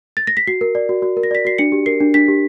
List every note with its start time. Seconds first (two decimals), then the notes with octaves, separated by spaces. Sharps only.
0.17 A6
0.27 A#6
0.37 B6
0.47 F#4 C7
0.61 A#4
0.75 D5
0.89 F#4
1.02 F#4
1.17 A#4
1.23 A#6
1.31 D5 B6
1.45 F#4 C7
1.58 D4 C#7
1.72 G4
1.86 A#4 C7
2.00 D4
2.14 D4 B6
2.28 G4